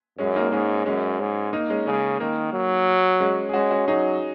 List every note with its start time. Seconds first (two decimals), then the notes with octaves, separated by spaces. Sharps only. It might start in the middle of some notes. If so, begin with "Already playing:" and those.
0.18 F#2 G#3 C#4
0.36 A#3 D#4
0.52 G#2 G#3 C#4
0.86 F#2 G#3 C#4
1.20 G#2
1.53 A#3 D#4
1.70 G#3 C#4
1.86 C#3 G#3 C#4
2.20 D#3 A#3
2.53 F#3
3.20 G#3 C#4
3.49 G#4
3.54 G#3 C#4 F#4
3.71 C#4 F#4
3.88 F#3 D#4 G#4